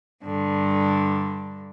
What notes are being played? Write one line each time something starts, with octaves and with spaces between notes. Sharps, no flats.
G2 D3